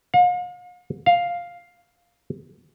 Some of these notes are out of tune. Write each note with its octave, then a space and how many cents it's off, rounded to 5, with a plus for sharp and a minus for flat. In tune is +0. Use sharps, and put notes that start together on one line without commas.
F5 +45
F5 +5